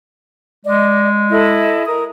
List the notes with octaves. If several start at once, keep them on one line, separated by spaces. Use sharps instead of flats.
G#3 D5 D#5
E4 A4 D#5
A#4 D#6